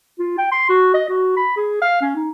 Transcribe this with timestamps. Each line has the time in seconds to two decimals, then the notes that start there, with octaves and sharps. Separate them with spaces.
0.19 F4
0.38 G5
0.52 C6
0.69 F#4
0.94 D#5
1.09 F#4
1.37 B5
1.57 G#4
1.82 F5
2.02 C#4
2.16 D#4